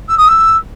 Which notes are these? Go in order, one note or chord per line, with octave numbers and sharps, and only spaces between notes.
E6
D#6
E6